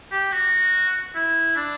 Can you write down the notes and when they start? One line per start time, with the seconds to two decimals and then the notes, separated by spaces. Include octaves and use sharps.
0.11 G4
0.32 F#4
1.15 E4
1.56 D4